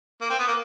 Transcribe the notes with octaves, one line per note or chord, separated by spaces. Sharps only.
A#3
C4
B3
A#3